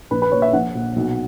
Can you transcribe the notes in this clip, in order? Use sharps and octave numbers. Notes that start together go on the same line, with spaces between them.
A#1 B4
B4
A#2 C#5
E5
A#1 F#5
A#2
B1